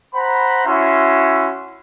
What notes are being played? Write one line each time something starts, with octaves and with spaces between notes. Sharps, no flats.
C5 F#5 A#5 B5
C#4 E4 F#4 E5 C6